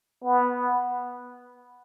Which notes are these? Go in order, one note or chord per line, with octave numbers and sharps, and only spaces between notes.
B3